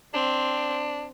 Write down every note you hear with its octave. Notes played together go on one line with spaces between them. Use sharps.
C4 D4